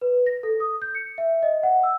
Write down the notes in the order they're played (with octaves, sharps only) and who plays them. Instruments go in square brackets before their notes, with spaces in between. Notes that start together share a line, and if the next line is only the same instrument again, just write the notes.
[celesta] B4
A#6
A4
D#6
G6
C#7
E5
D#5
F#5
E6